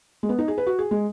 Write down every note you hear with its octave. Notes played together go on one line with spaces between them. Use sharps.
G#3
B3
D#4
G#4
B4
F#4
G#4
G#3